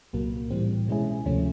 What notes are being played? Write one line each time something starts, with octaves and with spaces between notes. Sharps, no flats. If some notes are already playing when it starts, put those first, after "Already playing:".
C2 A#2 F#3 A#3
A2 E3 G3 C4
B2 G#3 C#4 E4 G#4
D2 C3 F3 A3 C#4